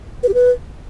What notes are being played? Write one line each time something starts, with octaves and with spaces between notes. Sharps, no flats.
B4
G4
B4